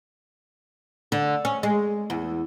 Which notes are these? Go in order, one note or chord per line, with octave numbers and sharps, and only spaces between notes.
D3
C#4
G#3
E2